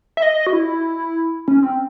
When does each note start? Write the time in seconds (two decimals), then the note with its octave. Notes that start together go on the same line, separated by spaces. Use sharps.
0.17 E5
0.22 D#5
0.47 F#4
0.53 E4
1.48 C#4
1.63 C4